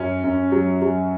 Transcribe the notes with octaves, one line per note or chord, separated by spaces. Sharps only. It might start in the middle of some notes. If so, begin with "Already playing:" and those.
Already playing: F#2 F#3 C#4
F#2
F#3
F#3